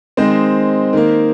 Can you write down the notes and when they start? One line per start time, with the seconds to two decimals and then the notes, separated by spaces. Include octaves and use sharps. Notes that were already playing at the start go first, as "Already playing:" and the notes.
0.17 D#3 G#3 C4 C5 D#5
0.93 D#3 A#3